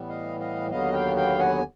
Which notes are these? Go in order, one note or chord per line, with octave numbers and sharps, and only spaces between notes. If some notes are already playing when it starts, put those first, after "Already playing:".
Already playing: A2 E3 G3 B3
D#5 F5
D#5 F5
D#2 D3 F#3 B3 D#5 F5
F5 G5
F5 G5
F#5 G#5